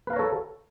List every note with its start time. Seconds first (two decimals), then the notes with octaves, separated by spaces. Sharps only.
0.07 B4
0.10 F5
0.13 A#5
0.16 C#5
0.19 A4